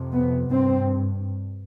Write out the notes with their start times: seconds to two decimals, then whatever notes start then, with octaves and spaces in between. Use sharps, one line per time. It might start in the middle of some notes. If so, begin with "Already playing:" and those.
Already playing: F2 C3
0.13 B3
0.51 G2 C4